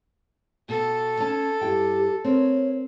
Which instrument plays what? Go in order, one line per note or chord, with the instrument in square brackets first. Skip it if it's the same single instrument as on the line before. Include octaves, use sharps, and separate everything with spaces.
[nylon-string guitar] B2 [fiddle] A4
[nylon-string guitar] C#4 A5
[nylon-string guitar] G2 E4 G5 [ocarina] G4
[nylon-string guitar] C4 A#4 [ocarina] C#5